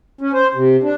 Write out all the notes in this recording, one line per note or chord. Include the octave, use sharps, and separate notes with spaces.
C#4
C5
C3
D4